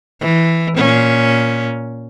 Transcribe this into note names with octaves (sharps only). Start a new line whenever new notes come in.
E3
A#2 C#4